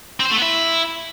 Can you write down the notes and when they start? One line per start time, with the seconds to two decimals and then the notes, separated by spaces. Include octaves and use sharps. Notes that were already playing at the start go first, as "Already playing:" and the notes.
0.20 C4
0.25 C5
0.31 A3
0.37 B3
0.42 E4